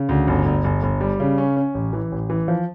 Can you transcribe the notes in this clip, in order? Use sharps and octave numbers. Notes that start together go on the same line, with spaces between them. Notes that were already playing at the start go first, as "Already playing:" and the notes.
Already playing: C#3
D2
G1
G1
G1
G1
G3
C#3
C#4
C#4
A1
E3
A1
E3
F3